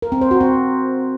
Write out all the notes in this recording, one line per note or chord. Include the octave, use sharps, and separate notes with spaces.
A#4
C4
C5
F#4
C4